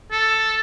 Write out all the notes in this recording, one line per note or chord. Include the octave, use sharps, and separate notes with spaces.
A4